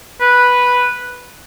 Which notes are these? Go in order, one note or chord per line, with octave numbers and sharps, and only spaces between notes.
B4